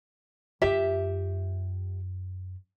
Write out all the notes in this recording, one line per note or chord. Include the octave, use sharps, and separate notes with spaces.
F#2 F4 G4 E5